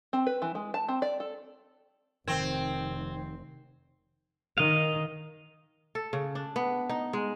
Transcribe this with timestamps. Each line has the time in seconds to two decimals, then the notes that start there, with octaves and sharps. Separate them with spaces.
0.13 C4
0.27 B4
0.42 E3
0.55 G#3
0.74 A5
0.88 C4
1.02 D5
1.20 A4
2.28 F1 D#3 C4 C5 G5 G#6
4.58 D#3 D#5 F5
5.95 A4
6.13 C#3
6.35 D4
6.56 B3
6.89 D#4
7.13 G#3